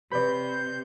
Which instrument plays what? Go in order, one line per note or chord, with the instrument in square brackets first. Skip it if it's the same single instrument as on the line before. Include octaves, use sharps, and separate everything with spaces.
[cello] C3 [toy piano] G4 B4 C#5 [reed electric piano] D5 B5 [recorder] G6